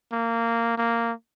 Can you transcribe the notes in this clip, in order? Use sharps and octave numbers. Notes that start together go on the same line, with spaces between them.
A#3
A#3